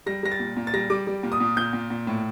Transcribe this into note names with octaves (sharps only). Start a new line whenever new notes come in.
G3 A#6
G3 A#6
A6
A#2
A#2
A6
G3 A#6
G3 D6
G3
A#2
D#6
A#2
A#2 G6
A#2
A#2
A2